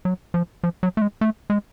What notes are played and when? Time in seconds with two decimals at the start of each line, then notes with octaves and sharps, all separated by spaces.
0.05 F#3
0.34 F3
0.64 F3
0.83 F#3
0.97 A3
1.02 G#3
1.21 A3
1.50 G#3